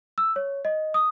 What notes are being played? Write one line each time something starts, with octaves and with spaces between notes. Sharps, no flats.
E6
C#5
D#5
D#6